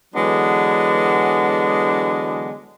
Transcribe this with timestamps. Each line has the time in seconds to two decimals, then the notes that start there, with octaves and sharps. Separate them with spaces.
0.14 D3 E3 F#3 G#3 B3 D4